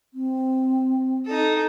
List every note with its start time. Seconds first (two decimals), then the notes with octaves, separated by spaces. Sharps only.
0.14 C4
1.26 D#4 A4